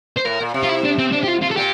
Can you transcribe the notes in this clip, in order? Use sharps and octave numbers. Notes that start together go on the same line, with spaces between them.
C5
A2 A#4
A#2
C3
F4
E4
D4
C4
D4
G4
F4
F4
A4
A#2 G4